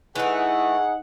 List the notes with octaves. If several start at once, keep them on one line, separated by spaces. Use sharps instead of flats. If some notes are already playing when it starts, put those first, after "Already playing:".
E3 A3 D#4 G#4 F#5